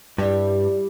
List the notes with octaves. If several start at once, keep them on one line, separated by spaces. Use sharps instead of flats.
G2 G3 E4 G4 D5